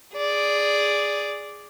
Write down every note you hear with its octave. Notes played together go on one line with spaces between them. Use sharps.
G#4 D5